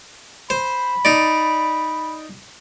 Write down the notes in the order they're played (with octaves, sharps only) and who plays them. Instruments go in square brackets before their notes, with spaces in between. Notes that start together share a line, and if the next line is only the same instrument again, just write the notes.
[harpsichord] C5 [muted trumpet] B5
[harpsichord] D#4 D5